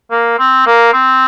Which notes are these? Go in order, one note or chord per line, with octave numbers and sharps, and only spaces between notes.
A#3
C4
A#3
C4